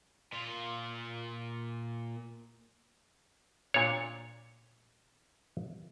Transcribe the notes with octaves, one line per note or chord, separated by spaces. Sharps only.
A#2 F4
A#2 D4 C#5